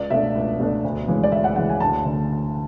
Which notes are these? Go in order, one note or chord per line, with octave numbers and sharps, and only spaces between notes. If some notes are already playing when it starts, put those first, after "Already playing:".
Already playing: C#2 D5
B2 A3 D4 E5
C#2
B2 A3 D4
D2
C#3 E3 G#3
D5
D2 E5
F#5
C#3 E3 G#3 F#5
G#5
D2 A5
D3 A3